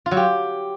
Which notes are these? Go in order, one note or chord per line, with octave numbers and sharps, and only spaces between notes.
F4
F#3
G4